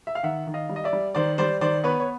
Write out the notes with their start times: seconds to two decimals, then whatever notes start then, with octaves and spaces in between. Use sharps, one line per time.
0.07 E5
0.15 F5
0.23 D#3 E5 F#5
0.47 D#3
0.54 D#5 F5
0.69 G3
0.76 D#5
0.84 D5 E5
0.93 G3
1.15 D#3 C5 D5
1.38 G3 C5 D5
1.61 D#3 C5 D5
1.84 B3 B4 C#5
2.00 C#5